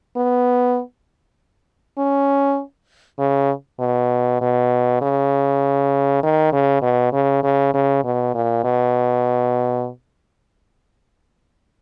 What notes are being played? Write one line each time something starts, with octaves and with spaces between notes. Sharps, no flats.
B3
C#4
C#3
B2
B2
C#3
D#3
C#3
B2
C#3
C#3
C#3
B2
A#2
B2